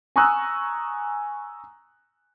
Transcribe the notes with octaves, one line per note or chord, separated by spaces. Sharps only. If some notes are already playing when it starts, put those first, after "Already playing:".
G#5 A#5 C#6 D#6 E6 F#6